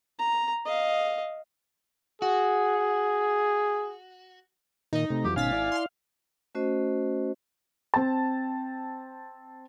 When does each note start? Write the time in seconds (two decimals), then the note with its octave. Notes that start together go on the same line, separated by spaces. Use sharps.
0.19 A#5
0.65 D#5 F5
2.22 F#4 G#4
4.93 A#2 D#3 D#4 D#5
5.10 C3 A3
5.24 F2 E3 F#3 G4
5.36 G#1 B2 C#4 D#4 F5 G#5 A6 B6
5.52 E4 D5
5.72 C6 F6
6.55 A3 C#4 F#4 C5 D#5
7.94 C4 A5